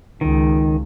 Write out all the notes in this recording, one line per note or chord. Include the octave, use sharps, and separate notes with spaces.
C#2 D#3